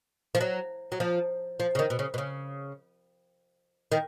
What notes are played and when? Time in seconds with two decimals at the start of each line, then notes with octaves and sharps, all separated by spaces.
0.35 F3
0.41 F#3
0.92 F#3
1.00 F3
1.60 F3
1.75 C#3
1.79 D#3
1.90 B2
1.99 C#3
2.14 B2
2.18 C#3
3.92 D#3